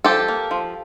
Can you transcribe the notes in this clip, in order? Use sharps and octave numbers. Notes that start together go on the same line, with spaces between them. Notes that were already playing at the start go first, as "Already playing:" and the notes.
F3 G4 A4
A#3
F3